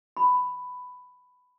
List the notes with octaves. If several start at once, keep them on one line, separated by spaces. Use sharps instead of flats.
B5